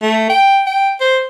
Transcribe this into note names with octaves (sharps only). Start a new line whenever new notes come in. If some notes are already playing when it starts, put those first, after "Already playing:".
A3
G5
G5
C5